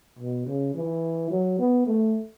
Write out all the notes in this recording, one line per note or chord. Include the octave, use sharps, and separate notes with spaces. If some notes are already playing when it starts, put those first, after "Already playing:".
B2
C#3
E3
F#3
B3
A3